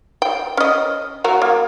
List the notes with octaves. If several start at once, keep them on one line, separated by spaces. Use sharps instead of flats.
G5
C#4 D#5
F#3 F#4 A#4
A#3